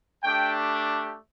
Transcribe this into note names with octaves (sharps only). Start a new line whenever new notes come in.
A3 D4 G4 G5